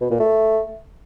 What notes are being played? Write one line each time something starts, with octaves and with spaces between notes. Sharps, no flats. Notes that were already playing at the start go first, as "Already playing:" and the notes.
B2
A#2
A3